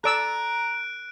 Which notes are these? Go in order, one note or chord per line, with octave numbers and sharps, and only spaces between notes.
A4 D5 A#5 E6 F#6 D7